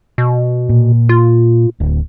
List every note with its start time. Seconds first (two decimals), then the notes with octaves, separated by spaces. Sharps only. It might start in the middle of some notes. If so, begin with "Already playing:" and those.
0.18 B2
0.69 A#2
1.09 F4
1.80 D1